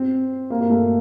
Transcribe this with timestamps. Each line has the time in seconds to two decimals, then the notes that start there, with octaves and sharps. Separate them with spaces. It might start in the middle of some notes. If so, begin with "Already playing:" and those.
Already playing: C4
0.50 A#3
0.61 A#3
0.70 A3